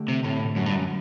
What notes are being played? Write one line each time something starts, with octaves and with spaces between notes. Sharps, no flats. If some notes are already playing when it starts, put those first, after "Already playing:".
Already playing: D3 A3 D4 G4
C3
A2
F#2
G2
F#2